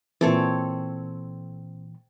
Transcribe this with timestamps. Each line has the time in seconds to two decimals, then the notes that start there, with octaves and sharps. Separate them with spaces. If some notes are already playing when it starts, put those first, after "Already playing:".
0.21 A#2 E3 C4 A4 C#5